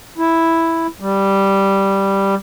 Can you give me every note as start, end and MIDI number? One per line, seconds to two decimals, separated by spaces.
0.18 0.87 64
1.00 2.35 55